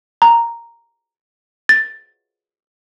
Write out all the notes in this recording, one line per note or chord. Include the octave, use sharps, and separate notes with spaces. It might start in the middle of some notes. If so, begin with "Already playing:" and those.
A#5
A6